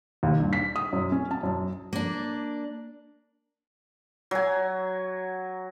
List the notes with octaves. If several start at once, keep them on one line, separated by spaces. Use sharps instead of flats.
D#2
G2
B6
D#6
F#2
C#4
A5
F#2
A#3 D4
F#3 G#5